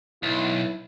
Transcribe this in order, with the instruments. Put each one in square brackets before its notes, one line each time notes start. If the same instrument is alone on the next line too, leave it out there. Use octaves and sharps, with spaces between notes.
[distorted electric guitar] B1 [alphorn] E4